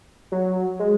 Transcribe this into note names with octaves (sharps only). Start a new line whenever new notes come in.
F#3
G#3